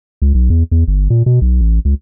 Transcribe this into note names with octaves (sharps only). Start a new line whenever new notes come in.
C#2
B1
E2
E2
G1
A#2
B2
B1
A1
C#2